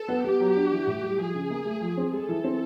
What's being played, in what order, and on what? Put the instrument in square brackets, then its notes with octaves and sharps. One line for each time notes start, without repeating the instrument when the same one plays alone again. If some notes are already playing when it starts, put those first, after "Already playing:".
Already playing: [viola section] A4
[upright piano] B3
[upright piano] B3 [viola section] G4
[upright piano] F#3
D4
E3
A2
G3
[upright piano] F3 [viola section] G#4
[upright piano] C#3
A#3
A3
F3
C4
[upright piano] G#3 [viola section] A4
[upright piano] E3
C4